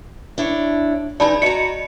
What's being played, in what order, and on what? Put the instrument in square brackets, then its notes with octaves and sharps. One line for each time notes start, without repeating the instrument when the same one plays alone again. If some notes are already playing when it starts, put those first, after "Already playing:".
[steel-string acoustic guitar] D4 E4 C#5
[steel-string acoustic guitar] E3 D#4 G#4 [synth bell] D5 A5 B5
[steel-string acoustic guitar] F#4 A#5 [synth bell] D#5 C#7